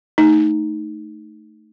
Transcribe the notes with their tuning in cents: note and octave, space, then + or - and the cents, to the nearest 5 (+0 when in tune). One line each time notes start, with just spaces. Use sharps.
A3 +0 D#4 +0